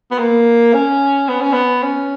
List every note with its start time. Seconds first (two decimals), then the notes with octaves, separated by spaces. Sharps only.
0.12 B3
0.19 A#3
0.74 C#4
1.28 B3
1.40 C#4
1.53 B3
1.83 C#4